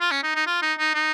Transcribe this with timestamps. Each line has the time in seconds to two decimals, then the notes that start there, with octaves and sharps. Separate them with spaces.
0.01 F4
0.11 C#4
0.23 D#4
0.35 D#4
0.47 F4
0.62 D#4
0.79 D#4
0.94 D#4